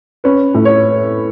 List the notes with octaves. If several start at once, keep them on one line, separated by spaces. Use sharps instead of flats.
C#4 B4
A2
C#5